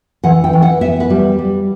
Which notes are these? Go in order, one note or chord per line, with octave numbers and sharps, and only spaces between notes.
E3 F#5
G5
E3
F#5
B3 E5
B4
G3
G3